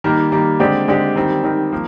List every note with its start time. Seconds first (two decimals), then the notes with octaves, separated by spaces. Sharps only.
0.04 D#3 G3 A#3
0.32 D#3 G3 A#3
0.60 D3 G#3 C4 G4 D5
0.88 D3 G#3 C4 G4 D5
1.16 D#3 G3 C4
1.44 D#3 G3 C4
1.72 F3 A#3